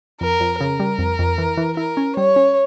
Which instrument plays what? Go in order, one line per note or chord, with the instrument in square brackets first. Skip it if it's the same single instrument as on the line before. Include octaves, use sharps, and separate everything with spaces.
[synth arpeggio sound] F2 [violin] A#4
[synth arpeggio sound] F2
[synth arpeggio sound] C#3 [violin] A#4
[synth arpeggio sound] G3
F2
F2
E3
E3
[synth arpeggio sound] E4 [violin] A#4
[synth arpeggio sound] C#4
[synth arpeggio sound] G3 [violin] C#5
[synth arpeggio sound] C#4